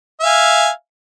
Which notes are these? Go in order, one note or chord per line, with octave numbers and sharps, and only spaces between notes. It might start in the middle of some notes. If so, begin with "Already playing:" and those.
E5 F5 G#5